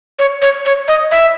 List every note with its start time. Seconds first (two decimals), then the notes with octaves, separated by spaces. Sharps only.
0.19 C#5
0.42 C#5
0.65 C#5
0.88 D#5
1.12 E5